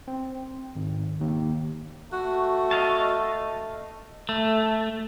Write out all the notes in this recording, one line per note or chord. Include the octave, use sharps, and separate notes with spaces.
C4
G#1
D#2
A3 F#4
D#5 F5 A5
A3